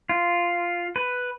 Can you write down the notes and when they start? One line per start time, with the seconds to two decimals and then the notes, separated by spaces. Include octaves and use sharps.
0.09 F4
0.96 B4